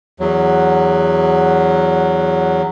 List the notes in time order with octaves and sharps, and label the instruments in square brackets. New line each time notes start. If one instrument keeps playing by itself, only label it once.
[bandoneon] E2 F#3